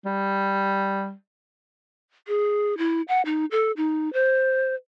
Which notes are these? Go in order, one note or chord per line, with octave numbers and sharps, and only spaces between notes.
G3
G#4
E4
F#5
D#4
A4
D#4
C5